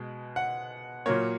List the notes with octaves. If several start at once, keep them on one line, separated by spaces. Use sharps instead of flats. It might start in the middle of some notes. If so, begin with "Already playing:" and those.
Already playing: B2 G#3
F#5
A#2 F#3 A#3 C#5